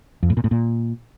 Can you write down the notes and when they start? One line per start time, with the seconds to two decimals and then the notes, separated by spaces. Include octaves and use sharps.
0.23 F2
0.30 A2
0.37 A#2
0.44 A2
0.51 A#2